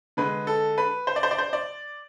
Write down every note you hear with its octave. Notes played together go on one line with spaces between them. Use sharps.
D3 G#3 B4
A4
B4
C5
D5
C5
D5
C5
D5